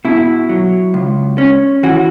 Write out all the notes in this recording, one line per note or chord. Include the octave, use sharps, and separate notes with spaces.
B2 E4
F#3
C#2
C#4
E3 F#4